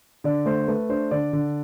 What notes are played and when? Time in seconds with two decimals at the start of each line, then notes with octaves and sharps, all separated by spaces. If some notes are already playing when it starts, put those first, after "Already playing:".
0.24 D3 D5
0.46 A3 C5
0.68 A3 B4
0.89 D4 C5
1.11 D3 D5
1.33 D3